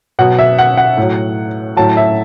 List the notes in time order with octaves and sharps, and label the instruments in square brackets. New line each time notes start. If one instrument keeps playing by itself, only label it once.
[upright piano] B2 F#3 F#5
E5
F#5
F#5
A2 F#3
A2 F#3 A5
E5